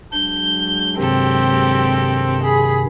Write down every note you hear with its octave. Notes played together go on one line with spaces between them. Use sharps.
F#3 G#3 D4 G6
G2 C3 D#3 C4 G4 A4
G#4 B5